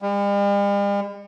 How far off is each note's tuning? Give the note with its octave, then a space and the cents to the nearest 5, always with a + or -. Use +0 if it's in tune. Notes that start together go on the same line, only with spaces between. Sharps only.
G3 +45